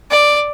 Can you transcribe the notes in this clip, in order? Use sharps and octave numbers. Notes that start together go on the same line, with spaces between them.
D5